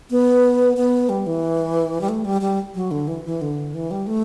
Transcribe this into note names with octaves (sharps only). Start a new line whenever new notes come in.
B3
B3
G3
E3
G3
A3
G3
G3
F#3
D3
E3
E3
D3
E3
G3
A3